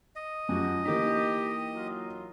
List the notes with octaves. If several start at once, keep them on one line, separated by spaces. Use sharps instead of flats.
D#5
F#2 F3 F#4 G4
E3 A#3 D#4 G4
F#3 F4